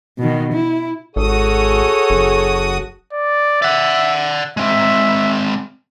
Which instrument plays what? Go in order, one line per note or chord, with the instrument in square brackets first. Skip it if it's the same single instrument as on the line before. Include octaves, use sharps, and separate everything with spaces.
[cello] B2 D#3
E4
[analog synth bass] G#1 [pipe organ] F#4 D#6 [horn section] G#4 A4 C#5
[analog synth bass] F#1
[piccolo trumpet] D5
[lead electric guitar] D5 F#5 [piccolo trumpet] E5
[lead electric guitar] G#3 C4 [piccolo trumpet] E5